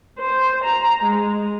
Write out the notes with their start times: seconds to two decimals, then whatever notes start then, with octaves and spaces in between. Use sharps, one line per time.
0.19 C5
0.64 A#5
1.03 G#3